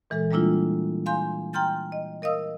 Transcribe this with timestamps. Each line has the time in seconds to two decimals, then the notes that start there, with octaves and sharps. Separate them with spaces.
0.10 A#2 E3 G#3 A4
0.31 G3 G#3 A#3 D4 E4 F4
1.06 F5 G#5 C6 G6
1.53 G5 A#5 C6 F6 G6 A6
1.92 D#5
2.22 A#4 D#5 F5 D#6 E6